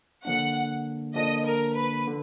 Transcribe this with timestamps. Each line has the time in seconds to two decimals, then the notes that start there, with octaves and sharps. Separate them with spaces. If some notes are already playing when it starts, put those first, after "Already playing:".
0.24 D3 F3 A#3 D4 F#5
1.15 D3 F3 A#3 D4 D#5
1.46 A#4
1.75 B4
2.07 D3